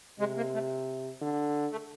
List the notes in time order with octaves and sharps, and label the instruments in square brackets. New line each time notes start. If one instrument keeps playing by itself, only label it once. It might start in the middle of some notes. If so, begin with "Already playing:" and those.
[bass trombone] C3 [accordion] G#3
[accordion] A#3
A3
[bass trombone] D3
[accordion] A3